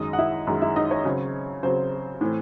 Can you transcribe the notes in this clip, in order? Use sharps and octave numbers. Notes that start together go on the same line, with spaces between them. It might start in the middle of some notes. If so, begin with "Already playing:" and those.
Already playing: F#2 D#3 G#3 D#5 D#6
F#5
E4 E5
F#2 D#3 G#3
E4 E5
D#4 D#5
C#5
C#3 F#3 C4
C#3 F#3 C4 C5
A2 E3 C4